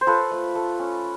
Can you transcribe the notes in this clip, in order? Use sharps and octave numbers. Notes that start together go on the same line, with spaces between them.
C5
F4 A4 B4
A3
A3
C#4